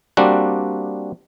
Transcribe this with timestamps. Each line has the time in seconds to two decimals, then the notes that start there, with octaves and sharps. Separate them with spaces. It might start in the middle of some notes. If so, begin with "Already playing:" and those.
0.17 G3 A#3 C4 D4 F#4